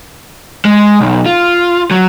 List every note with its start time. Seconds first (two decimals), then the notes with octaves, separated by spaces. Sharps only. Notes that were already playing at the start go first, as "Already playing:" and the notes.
0.65 G#3
1.01 B1
1.26 F4
1.91 F#3